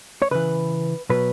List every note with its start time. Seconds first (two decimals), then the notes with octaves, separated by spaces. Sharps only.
0.22 C#5
0.31 C#3 E3 B4
1.10 B2 F#3 B4